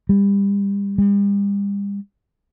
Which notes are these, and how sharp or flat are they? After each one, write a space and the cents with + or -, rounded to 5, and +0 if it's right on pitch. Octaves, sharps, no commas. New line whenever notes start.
G3 +30
G3 +40